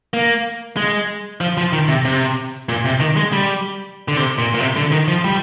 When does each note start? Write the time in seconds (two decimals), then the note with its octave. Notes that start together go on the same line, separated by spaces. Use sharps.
0.14 A#3
0.77 G#3
1.41 F3
1.57 F3
1.73 D#3
1.88 C3
2.05 C3
2.69 A#2
2.85 C3
3.00 D#3
3.16 G#3
3.33 G3
4.08 D3
4.17 C3
4.38 A#2
4.54 A#2
4.60 C3
4.76 D3
4.92 D#3
5.08 F3
5.25 G3